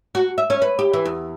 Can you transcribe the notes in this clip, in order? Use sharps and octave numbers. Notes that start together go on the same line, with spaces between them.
F#4
E5
C#4
B4
G4
E3
E2